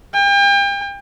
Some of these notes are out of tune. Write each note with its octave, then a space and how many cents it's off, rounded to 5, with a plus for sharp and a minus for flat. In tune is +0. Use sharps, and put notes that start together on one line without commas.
G5 +35